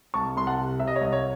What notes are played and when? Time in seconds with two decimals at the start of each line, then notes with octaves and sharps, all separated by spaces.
0.14 C2 A5 C#6
0.36 C2 C6
0.47 F#5 A5
0.58 C3
0.80 C3 E5
0.87 D#5
0.96 C#5
1.01 C2 D#5
1.13 C#5